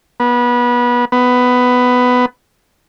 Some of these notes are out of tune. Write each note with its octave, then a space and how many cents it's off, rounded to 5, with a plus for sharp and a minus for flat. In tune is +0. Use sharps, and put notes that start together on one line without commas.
B3 -25
B3 +10